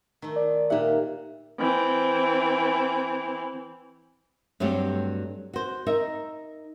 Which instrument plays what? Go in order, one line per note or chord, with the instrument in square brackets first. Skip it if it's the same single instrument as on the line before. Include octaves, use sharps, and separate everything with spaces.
[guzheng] D#3 A3
[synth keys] D5
[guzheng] A#2 F#5 [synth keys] D#4 G4 E5
[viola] E3 C4
[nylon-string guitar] G2 F#3 A3 C4 G4
F#4 C5
D#4 A#4 E5